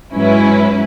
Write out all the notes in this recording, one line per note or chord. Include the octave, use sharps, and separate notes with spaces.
G#2 F#3 C#4 E4 B4